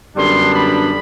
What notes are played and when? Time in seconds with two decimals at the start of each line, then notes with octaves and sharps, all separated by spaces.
0.16 F#2 D3 G3 B3 D4 C6
0.54 B5